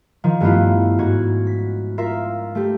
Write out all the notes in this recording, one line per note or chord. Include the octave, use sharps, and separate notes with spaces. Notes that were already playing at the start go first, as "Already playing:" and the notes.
D#3 F3
G2 A3 B3 C#4 E4 F4
G#2 F#4 G#6
B6
F4 A#4 E5
A3 G4